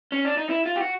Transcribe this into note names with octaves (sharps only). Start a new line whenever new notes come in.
C#4
D4
D#4
E4
F4
G4
F#4